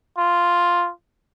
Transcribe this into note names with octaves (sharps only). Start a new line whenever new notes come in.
F4